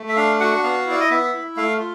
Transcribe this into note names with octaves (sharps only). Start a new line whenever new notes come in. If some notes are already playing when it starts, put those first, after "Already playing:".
Already playing: A3
E5
D4 F5
F#4 F#5
B3 F5
E4 D5
D#5
B3 E5
E4
A3 F5
F4